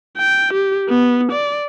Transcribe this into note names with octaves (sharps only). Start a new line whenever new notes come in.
G5
G4
B3
D5